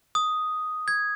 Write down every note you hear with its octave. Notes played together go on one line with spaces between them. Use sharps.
D#6
G#6